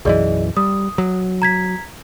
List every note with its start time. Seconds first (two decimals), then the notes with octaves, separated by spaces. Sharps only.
0.05 B1 F#2 E3 G#4 D5 D#5
0.57 G3 D#6
0.98 F#3
1.42 A#5 G#6 B6